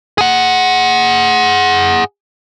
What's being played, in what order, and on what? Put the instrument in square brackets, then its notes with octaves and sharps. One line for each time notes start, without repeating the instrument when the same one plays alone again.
[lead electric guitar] G#4 F#5